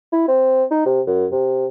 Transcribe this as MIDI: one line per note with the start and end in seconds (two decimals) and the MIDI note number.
0.13 0.25 64
0.28 0.64 60
0.71 0.86 63
0.86 1.01 48
1.07 1.26 42
1.32 1.67 48